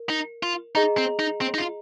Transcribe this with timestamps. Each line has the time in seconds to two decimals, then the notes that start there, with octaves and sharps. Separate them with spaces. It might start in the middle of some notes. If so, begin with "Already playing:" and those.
Already playing: A#4
0.09 D#4
0.43 F4
0.75 D#4 G#4 D#5 A#5
0.97 C4
1.19 D#4
1.41 C4
1.54 D#4
1.58 F4